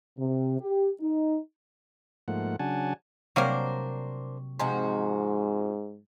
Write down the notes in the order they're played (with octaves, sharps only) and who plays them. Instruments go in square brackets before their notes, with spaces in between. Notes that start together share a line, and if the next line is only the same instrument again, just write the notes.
[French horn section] C3
G4
D#4
[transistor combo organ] G#2 F3 A3 A#3 F#5
C#3 F#3 D4 F#5 G#5 A5
[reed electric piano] C3 C#6 [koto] F#3 G3 A#3 [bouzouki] D4 A#4 C5
[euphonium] G#2 [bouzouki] C3 F3 F#4 [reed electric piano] D#5 G#5 C6